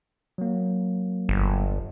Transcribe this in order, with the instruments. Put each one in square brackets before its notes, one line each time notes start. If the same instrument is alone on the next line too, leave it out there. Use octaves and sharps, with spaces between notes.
[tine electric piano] F#3 A#3
[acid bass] G1